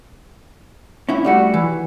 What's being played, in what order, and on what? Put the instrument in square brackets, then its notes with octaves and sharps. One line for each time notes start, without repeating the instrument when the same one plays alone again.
[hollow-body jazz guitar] C#4 E4
[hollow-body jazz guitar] G3 A3 F#4 [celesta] D5 F#5 C#7
[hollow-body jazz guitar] E3